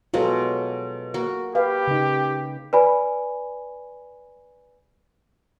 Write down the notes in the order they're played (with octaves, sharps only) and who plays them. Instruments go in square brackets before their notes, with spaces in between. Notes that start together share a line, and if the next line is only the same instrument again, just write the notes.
[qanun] B2 F#3 G#3 [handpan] F4 G#4 A4
[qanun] A#3 F#4
[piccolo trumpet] G4 [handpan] B4 F5
[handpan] C#3 D#4
[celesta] B4 D5 G#5 B5